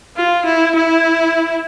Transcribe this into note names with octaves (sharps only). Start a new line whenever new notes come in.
F4
E4
E4